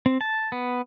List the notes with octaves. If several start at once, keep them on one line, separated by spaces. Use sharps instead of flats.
C4
A5
B3